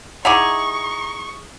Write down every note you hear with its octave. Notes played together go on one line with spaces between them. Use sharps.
D#4 E4 G#4 F#5 A#5 C#6 D6 F7